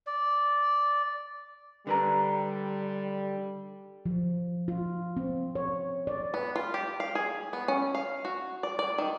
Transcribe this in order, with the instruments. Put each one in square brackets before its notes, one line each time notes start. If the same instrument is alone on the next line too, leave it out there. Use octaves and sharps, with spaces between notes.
[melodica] D5
[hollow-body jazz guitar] D3 B4 A#5 [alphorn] G3
[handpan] F3
F4
C4
C#5
D5
[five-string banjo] B3
F4
G4
F5
G#4
B3
C#4
F5
F#4
D5
D5
D#3